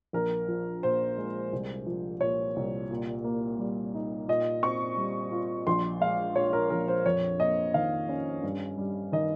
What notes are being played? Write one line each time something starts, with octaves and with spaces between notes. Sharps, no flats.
A#1 A#4
F3
A#2 C5
G#3
C2
F3
A#2 C#5
C2
A#2
A#3
G3
D#4
A#2 D#5
C4 C#6
G3
F4
A#1 C6
G#3 F5
A#2 C#5
A#4
A#1 A#4
C5
F2 C#5
A#3 D#5
D#3 F5
C#4
G2
G3
D#3 D#5